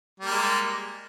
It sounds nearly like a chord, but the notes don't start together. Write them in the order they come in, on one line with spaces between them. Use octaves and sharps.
G3 A#3 G#3